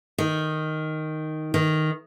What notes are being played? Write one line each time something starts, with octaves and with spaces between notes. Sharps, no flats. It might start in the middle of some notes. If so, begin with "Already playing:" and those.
D#3
D#3